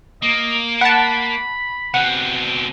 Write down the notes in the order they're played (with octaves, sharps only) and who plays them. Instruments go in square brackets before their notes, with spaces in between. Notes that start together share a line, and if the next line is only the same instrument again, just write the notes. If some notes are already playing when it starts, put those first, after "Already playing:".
[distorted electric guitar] A#3 [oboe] D#5
[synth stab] F#5 A5 [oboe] B5
[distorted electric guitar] B2 C4 [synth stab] F#5